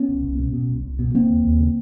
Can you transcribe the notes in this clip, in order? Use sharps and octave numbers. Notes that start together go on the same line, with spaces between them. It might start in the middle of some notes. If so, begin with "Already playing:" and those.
Already playing: B3 C#4
C2
C2
B2
B2
C2
C2
B2
C#3 A#3 C4
D#2
D#2
C#3